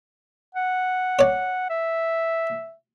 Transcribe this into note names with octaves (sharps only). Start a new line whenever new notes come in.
F#5
C#5 D5
E5